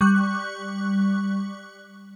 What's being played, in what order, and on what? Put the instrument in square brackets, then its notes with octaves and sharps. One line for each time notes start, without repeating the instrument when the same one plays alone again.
[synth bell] G3 C#6 F#6